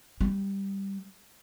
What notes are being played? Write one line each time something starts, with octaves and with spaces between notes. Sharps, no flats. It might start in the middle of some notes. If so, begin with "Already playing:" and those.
G3